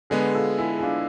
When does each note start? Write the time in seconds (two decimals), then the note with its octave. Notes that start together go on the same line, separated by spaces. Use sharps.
0.10 D3 G#3 B3 G#4 B4
0.35 F4 A4
0.58 E4 G#4
0.79 G#4
0.82 D4 F4